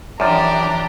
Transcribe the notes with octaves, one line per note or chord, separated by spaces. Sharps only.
F#2 E3 F3 D4 G4 D5 A#5